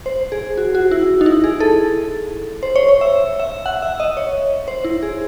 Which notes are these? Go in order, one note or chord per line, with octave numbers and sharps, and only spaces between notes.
C5
G#4
F#4
F#4
E4
D#4
E4
G#4
A4
C5
C#5
C#5
E5
E5
F#5
E5
D#5
C#5
C5
E4
G#4